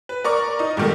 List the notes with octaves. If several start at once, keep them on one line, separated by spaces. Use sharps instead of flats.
B4
A#4 D5 C#6
D#4 D#5
G#2 B2 D#3 G3 A3